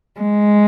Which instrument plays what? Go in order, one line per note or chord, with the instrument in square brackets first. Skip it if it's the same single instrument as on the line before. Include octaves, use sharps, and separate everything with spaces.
[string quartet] G#3